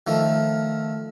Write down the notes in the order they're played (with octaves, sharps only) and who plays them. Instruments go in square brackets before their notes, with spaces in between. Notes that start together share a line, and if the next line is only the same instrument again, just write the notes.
[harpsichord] D#3 F3 A3